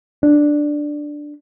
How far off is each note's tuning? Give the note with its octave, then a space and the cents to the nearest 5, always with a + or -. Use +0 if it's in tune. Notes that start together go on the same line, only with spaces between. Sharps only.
D4 +5